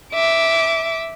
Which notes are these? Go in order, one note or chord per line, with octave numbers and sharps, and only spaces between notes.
E5 D6